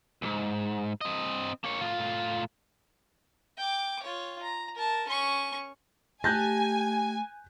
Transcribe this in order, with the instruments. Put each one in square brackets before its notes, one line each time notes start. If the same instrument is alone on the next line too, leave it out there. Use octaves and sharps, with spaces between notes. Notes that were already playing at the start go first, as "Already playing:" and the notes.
[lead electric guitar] B1 G#2
C4 D#5
A#3 C#5
A2 F4
[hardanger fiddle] G5 D6
F4 C#5
A#5
A#4 A5
C#4 C#6
[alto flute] A3 [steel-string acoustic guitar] G4 A5 [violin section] G#5 [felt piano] F#6 G6 A#6